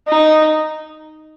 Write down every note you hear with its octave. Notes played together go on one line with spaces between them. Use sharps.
D#4